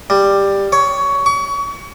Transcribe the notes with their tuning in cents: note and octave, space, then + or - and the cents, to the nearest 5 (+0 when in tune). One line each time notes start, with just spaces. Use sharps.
G3 +10
C#5 +15
C#6 +35